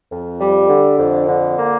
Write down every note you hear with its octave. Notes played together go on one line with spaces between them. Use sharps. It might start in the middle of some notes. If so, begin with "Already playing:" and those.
F2
G3
D3
F2
D3
A#3